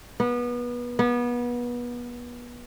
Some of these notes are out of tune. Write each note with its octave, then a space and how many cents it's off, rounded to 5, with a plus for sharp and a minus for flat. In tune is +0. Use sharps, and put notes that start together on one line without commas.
B3 -25
B3 -30